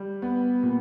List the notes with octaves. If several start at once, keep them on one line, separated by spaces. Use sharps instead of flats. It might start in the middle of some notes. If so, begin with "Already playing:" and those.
Already playing: G3
B3
A#2